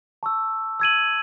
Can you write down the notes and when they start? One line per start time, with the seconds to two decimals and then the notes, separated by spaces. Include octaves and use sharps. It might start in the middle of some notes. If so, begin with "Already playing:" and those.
0.23 A5 C#6 E6
0.80 E6 G#6 D#7 F#7